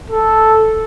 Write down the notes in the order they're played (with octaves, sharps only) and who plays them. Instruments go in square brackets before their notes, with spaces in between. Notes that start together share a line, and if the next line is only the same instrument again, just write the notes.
[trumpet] A4